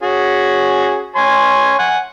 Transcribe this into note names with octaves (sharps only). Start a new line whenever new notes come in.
C#4 F#4 G#4
C#5 G#5 C6
F#5 G#5